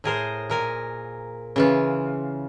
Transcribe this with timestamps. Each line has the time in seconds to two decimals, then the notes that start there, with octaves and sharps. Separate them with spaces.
0.04 A2 G#4 A#4 C5
0.50 A#2 A#4 G#5
1.56 C#3 E3 F4